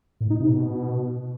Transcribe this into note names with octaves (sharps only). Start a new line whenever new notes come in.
A2
D#4
C3
B2